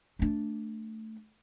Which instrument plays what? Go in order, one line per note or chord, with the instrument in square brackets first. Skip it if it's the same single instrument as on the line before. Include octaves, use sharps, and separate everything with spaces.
[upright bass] A3 D4